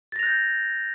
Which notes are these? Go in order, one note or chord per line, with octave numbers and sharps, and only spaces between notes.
F#6 G6 A6 A#6 F7